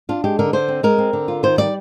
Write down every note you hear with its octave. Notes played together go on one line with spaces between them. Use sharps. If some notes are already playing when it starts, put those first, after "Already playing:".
D4 F4
G#3 G4
D3 A#4
D3 C5
C4
G#3 A#4
C4
D3
F4
D#3 C5
G3 D5